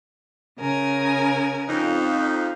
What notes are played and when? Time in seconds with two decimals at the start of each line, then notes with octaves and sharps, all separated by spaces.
0.59 C#3 A#4 G#5
1.68 F2 D#4